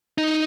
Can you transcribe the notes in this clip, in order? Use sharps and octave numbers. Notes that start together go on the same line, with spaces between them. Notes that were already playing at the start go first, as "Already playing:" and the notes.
D#4